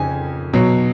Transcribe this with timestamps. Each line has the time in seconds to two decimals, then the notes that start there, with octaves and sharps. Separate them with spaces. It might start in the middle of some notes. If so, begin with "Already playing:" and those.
Already playing: F2 C#3 G#5
0.53 B2 F#3